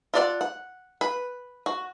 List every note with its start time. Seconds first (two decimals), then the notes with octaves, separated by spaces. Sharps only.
0.14 F4 A4 D5 F5 F#5
0.41 F#5
1.01 B4
1.66 F#4